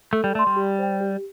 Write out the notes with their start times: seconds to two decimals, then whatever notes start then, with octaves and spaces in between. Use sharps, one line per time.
0.13 A3 A4
0.24 G3
0.35 A3 D5
0.39 C6
0.47 G3
0.56 G4
0.79 C5 G5
1.00 G4